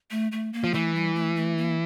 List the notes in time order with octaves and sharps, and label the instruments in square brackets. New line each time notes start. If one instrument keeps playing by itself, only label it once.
[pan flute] A3
A3
A#3
[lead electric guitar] F3
[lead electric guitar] E3 [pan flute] A3
[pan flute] G3
A3
A3
A#3